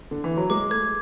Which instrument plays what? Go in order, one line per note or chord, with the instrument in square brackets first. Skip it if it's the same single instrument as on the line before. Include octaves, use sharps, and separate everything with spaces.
[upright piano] D3
E3
F#3
[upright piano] G#3 [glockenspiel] D6
[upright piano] A3 [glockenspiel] G#6